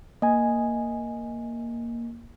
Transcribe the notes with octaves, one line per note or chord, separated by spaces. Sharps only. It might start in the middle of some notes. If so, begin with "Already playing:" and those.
A#3 D#5 G#5